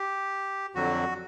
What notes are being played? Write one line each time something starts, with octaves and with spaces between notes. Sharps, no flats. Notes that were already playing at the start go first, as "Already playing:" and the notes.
Already playing: G4
F2 D3 F#3 F#4